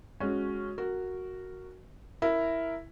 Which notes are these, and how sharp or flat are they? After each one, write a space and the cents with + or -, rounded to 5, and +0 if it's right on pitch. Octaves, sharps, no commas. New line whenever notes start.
G#3 +0 C#4 +0 F#4 -10
F#4 +0 A#4 -15
E4 +0 A#4 -5